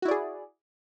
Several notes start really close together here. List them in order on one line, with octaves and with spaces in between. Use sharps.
F#4 E4 D5 G#4